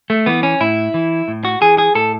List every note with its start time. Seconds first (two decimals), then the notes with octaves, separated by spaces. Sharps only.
0.10 A3
0.26 E3 B3
0.43 C#4
0.60 A2 E4
0.94 E3
1.28 A2
1.45 F#4
1.61 E3 G#4
1.78 G#4
1.95 A2 A4